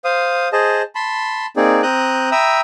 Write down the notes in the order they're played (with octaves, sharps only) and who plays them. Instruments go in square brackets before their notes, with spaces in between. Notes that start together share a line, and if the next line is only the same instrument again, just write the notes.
[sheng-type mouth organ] C5 F5 D#6
G#4 C5 D#5 A5
A5 B5 C6
A#3 C4 D#4 G#4 D5
C4 A#5 D#6 F#6 G6
E5 G5 A#5 B5 D#6 E6